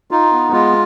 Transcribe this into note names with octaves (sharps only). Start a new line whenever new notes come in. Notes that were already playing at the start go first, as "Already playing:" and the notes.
D#4 F4
B3
G#3 F4